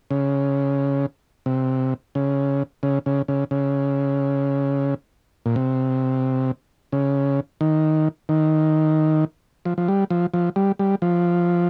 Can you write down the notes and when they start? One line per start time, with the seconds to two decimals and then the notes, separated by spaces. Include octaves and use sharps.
0.11 C#3
1.46 C3
2.15 C#3
2.83 C#3
3.06 C#3
3.28 C#3
3.51 C#3
5.46 A#2
5.56 C3
6.92 C#3
7.61 D#3
8.29 D#3
9.66 F3
9.78 F3
9.88 G3
10.10 F3
10.34 F3
10.56 G3
10.79 G3
11.02 F3